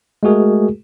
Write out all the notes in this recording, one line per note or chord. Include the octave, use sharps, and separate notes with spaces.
G#3 A3 F#4 G#4 A#4